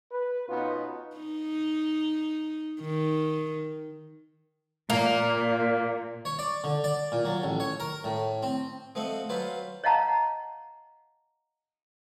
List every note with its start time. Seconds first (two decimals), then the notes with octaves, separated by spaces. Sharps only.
0.11 B4
0.49 B2 B3 C#4 D#4 F4
1.17 D#4
2.81 D#3
4.90 A#2 A#3
6.25 C#5
6.39 D5
6.64 D3
6.84 D5
7.12 A#2
7.25 F#3
7.43 A1
7.60 C#5
7.80 A#4
8.04 A2
8.43 C4
8.95 F3 A3 C4 D#5 F#5
9.29 F#3 C#4 F4 B4 C5
9.84 C#5 D#5 F5 F#5 A5 A#5